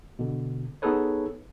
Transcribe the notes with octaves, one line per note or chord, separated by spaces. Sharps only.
B2 D3
B3 D#4 G#4 A4 B4 C#5